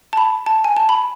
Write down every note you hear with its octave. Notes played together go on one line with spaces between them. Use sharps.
A5
B5
A5
G#5
A5
B5